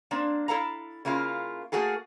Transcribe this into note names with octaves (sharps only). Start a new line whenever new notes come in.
A#3 C4 D4
E4 A4 F5 A#5
C#3 A#3 E4 F4
A3 A#3 F#4 G#4 A4